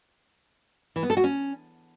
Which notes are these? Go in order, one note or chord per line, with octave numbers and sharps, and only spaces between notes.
E3
B3
A4
F#4
C#4